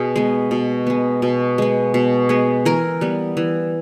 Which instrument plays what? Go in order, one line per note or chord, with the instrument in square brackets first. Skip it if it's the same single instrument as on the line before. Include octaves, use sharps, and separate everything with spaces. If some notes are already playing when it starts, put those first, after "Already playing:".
Already playing: [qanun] B2 G#4
G#3 B3
B2
G#3 B3
B2
G#3 B3
B2
G#3 B3
E3 A#4
G3 B3
E3